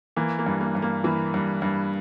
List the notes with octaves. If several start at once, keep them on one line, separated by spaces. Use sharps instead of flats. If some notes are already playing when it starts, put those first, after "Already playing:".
E3 A#3
A#3
G2
A#3
G2
A#3
E3 A#3
G2
G2